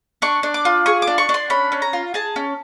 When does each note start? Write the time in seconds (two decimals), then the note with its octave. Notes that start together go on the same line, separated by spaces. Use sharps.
0.22 D4 C#6
0.43 D4
0.54 D6
0.65 F4
0.86 G#4 C#6
1.02 D6
1.07 D4
1.18 C#6
1.29 D4
1.34 C6
1.50 C#4 B5
1.72 C#4
1.82 A#5
1.93 F4
2.14 G#4 A5
2.36 C#4